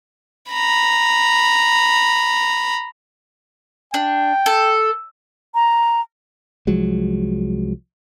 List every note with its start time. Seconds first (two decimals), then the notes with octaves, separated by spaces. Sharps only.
0.50 A#5 B5
3.94 D4 G5
4.46 A4
5.55 A#5
6.67 C2 F3 F#3 G#3